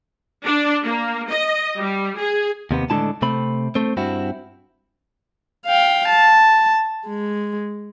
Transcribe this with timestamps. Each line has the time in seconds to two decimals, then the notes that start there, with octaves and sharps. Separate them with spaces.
0.45 D4
0.85 A#3
1.30 D#5
1.79 G3
2.18 G#4
2.71 D#2 C3 B3
2.90 A2 D3 G#3 E4 A5
3.22 C3 A3 C4 B5
3.75 A3 C4
3.97 G2 C4 E4 F#4
5.66 F5 G5
6.09 A5
7.06 G#3